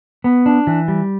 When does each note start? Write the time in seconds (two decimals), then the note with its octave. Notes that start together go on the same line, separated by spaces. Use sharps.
0.24 B3
0.46 D4
0.67 E3
0.88 G3